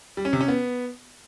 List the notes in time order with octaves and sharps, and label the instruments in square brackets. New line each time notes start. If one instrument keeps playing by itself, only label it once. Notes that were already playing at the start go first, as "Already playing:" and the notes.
[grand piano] G3
C#4
C3
C#4
B3